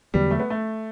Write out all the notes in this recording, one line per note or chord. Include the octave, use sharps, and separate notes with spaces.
E2 D3 F#3 G3 B3
A3
B3
A3